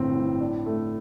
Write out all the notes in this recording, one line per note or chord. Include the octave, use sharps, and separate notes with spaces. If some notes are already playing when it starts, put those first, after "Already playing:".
Already playing: G1 A2 C4
A2
D4
A3